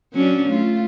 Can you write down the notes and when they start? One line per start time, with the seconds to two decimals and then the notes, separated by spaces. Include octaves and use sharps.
0.13 F#3 C#4 D4
0.49 A3 F4